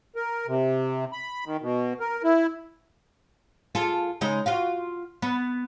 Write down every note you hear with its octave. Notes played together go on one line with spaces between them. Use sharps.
A#4
C3
B5
D#3
B2
A#4
E4
F4 G#4 A4
C#3 G#3 D#4
F4 F#4 F5
B3